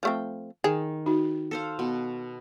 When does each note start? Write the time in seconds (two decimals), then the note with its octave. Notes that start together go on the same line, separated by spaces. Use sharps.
0.03 F3 A3 C4
0.64 D#3 G#4
1.06 D#4 F#4
1.51 A4 C5 F5
1.79 B2